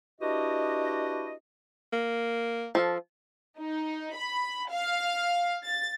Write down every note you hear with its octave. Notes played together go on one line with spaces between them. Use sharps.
D4 E4 F#4 G4 B4 D#5
A#3
F3 A4 F5
D#4
B5
F5
A6